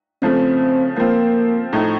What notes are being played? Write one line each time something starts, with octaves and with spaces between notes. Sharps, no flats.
C#3 F3 A3 C4
F3 A#3 C4 F4
A2 F3 A3 D#4